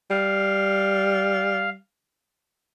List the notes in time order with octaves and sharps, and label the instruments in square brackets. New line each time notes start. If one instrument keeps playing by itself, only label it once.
[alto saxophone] G3 [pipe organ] F5